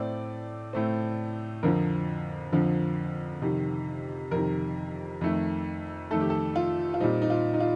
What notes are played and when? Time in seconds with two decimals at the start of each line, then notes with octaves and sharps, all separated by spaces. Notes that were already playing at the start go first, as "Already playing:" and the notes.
Already playing: A2 A3 C4 D5
0.73 A2 A3 C4
1.63 F2 D3 F3 C4 A#4
2.52 F2 D3 F3 C4
3.42 F2 C3 D#3
4.31 F2 C3 D#3 A#4
5.21 F2 D#3 A3
6.11 F2 D#3 A3 A4
6.20 G4
6.30 A4
6.56 F4
6.94 F4
7.00 A#2 G3 C4 D#4
7.22 D#4
7.30 F4
7.54 D#4
7.60 F4